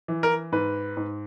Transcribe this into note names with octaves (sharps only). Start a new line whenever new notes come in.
E3
A#4
G#2 B4
G#2